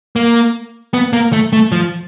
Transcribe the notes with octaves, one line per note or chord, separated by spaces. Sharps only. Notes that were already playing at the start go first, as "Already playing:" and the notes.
A#3
B3
A#3
A3
A3
F3